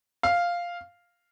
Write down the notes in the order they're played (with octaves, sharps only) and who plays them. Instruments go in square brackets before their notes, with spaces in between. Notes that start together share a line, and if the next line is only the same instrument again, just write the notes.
[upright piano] F5